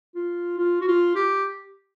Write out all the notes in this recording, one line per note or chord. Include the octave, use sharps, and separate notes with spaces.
F4
F4
F#4
F4
G4